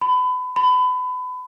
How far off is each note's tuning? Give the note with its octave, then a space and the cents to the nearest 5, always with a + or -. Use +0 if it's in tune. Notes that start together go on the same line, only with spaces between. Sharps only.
B5 +30
B5 +30